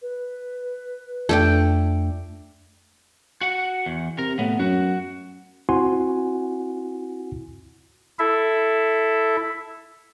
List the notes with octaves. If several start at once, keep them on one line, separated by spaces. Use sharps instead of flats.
B4
F2 A3 D4 G5
F#4 F#5
E2
C3 A#4
A2 B3
F#2 F#4
C4 E4 F#4 F#5 G#5 C6
E4 A4 E5